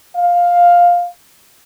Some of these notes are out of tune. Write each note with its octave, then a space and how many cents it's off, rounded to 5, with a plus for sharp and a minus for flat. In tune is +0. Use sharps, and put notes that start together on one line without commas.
F5 +10